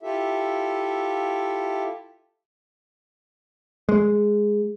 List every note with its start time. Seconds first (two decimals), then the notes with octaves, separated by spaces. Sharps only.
0.03 E4 F4 G4 A4 E5
3.89 G#3